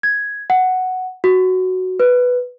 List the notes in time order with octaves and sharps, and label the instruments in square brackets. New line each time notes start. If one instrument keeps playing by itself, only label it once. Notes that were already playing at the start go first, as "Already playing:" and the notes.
[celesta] G#6
F#5
F#4
B4